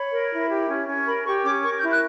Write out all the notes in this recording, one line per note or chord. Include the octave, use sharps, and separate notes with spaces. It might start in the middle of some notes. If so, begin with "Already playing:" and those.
Already playing: C#5 B5
A#4
E4
G4
C#4
C#4
A#4 B5
G4 C#6
C#4 D6
A#4 C#6
G6
E4
F#6